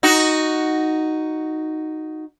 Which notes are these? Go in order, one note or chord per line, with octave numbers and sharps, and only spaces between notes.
D#4 F#4